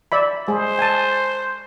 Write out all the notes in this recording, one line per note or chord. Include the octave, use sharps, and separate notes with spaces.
D5 E5 B5
G#3 G#4 C5
G#5 A5